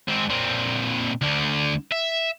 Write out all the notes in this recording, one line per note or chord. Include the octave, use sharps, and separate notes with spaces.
G#2 C4
A#2 C4
D2 D3
E5